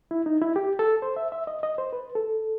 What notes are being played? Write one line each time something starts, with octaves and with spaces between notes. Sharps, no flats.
E4
D#4
E4
G4
A4
C5
E5
E5
D#5
D#5
C5
B4
A4